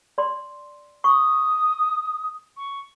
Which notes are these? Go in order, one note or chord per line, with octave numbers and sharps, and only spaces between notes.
D5 C6
C#6 D#6
C#6